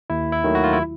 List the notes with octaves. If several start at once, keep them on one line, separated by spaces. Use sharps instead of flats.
D#2 E4
E4
D#3 F#3 A3
F#4
F4
E4